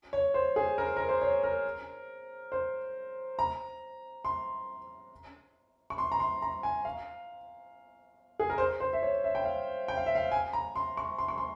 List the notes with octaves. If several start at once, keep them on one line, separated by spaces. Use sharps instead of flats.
C#5
C5
G#4
A#4
A#4
C5
C#5
A#4
C5
A#5
C6
C#6
C6
A#5
C6
A#5
G#5
F5
G#4
A#4
C5
C5
E5
C#5
E5
G5
F5
G5
F5
E5
F5
G#5
A#5
C6
C#6
C6
C#6
C6